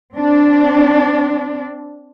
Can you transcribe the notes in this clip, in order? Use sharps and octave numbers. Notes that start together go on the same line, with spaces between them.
C4 D4